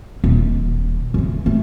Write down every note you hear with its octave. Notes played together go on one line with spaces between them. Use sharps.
D#1
C#3 E3
G3 A3